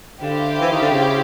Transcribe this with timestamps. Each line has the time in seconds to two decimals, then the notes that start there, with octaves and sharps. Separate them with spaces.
0.21 D3 E4 G4 C5 F5
0.61 E3
0.71 D#3
0.82 D3
0.91 C#3